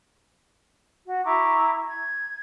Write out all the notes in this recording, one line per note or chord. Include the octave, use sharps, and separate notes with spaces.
F#4
E4 A#5 C#6 D6
G#6